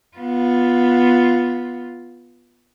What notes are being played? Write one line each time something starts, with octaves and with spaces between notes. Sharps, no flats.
B3 F4